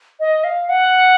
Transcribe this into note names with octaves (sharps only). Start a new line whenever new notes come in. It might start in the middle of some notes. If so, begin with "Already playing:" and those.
D#5
F5
F#5